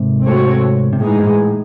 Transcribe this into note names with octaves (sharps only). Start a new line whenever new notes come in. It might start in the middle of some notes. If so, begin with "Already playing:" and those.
Already playing: G#2 C3
A3 C4 F#4 A4 C#5
C3
A2 E3 G#3 D#4 G#4
G#2
A2